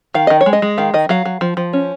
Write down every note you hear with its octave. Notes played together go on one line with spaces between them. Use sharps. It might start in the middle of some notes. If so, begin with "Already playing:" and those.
D#3 F5
D#3 D#5
C#5
G#3
D#5
G#3
D#3 F5
D#3 D#5
F#3 F5
F#3
F3
F3
C#4